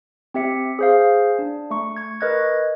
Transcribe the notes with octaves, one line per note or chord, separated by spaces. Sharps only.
C4 G4 E5 C#7
G#4 C5 F5
D4
A3 C#6
C#6 G#6
A#4 B4 D#5 F#6 G#6